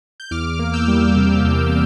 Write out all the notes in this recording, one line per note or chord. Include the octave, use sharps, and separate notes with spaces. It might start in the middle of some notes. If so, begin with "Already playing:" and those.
G6
E2 D6 F6
A#3
E6 G6
G3
C3
E2